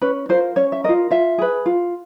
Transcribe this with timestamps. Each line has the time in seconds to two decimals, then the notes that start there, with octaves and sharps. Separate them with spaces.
0.02 C#4 B4
0.29 F4 A#4 C5
0.56 C#4 C#5
0.72 E5
0.84 A#4 D#5
0.89 F4
1.11 F4 E5
1.38 G#4 B4
1.66 F4